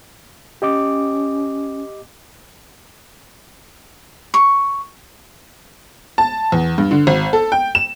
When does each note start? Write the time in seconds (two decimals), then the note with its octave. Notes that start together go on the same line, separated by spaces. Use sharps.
0.62 C#4 G4 D#5 D6
4.34 C#6
6.18 A5
6.52 E2
6.78 G2
6.91 D3
7.07 G#1
7.33 A4
7.52 G5
7.75 E7